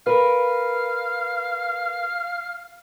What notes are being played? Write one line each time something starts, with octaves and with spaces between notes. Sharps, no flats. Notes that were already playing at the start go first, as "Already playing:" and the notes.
A#4 B4 F5